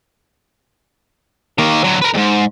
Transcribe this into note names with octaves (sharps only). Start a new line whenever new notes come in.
D#3 A#3
D3 F#3
A#4 B4
D#2 G#2